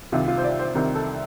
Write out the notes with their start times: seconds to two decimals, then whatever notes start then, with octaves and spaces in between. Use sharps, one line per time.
0.12 C2 C3 D#3 F4
0.28 F4
0.38 C5
0.44 D5
0.59 C5
0.75 C2 C3 D#3 A#4
0.96 A4